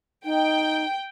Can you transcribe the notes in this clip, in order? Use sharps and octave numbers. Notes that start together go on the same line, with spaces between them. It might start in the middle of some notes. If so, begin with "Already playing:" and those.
D#4 G5